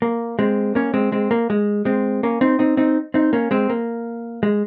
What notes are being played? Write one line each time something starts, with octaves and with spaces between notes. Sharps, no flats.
A#3
G#3 C4
A#3 C#4
G#3 C4
G#3 C4
A#3
G#3
G#3 C4
A#3 C#4
C4 D#4
C4 D#4
C4 D#4
C4 D#4
A#3 C#4
G#3 C4
A#3
G#3